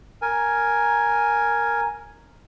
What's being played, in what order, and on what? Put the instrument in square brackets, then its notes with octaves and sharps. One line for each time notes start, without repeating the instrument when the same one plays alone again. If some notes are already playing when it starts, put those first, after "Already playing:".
[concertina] A#4 G#5